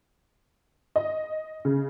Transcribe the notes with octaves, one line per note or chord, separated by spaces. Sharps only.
D#5
C#3